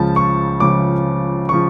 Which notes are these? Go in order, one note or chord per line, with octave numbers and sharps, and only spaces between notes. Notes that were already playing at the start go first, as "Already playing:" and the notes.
Already playing: C#2 C#3 F3 A5
C#6
C#2 C#3 F3 D6
C#3 F3 C#6